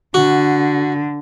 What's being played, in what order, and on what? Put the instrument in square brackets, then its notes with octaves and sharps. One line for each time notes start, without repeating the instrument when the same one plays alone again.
[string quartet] D3 [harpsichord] F#4